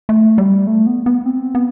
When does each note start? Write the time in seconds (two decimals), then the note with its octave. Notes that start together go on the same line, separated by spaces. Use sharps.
0.09 A3
0.38 G3
0.67 A3
0.87 B3
1.06 B3
1.26 C4
1.55 B3